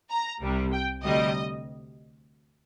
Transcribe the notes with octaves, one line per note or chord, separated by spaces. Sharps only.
A#5
C2 C3 G3
G5
D2 C3 G3 D#5